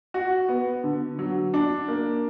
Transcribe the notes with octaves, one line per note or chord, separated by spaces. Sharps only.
F#4
B3
D3
F#3
D4
A#3